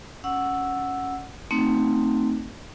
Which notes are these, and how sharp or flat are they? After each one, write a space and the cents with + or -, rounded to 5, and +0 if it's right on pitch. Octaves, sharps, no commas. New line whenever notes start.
C#4 +0 F#5 +0 E6 +0
A3 +30 C4 +0 D#4 +0